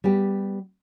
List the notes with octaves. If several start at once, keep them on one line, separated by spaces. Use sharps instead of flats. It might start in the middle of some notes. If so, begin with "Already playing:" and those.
G3 B3 G4